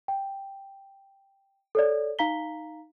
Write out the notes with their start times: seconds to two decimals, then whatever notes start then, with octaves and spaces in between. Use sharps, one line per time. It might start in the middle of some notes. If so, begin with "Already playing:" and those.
0.08 G5
1.75 A4 C#5 D5
2.19 D#4 F5 A#5 B6 G7